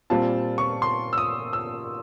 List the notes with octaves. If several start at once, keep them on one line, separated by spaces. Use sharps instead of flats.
A#2 G3 C4 F4 A5
C#6
C6
E6
D#6
E6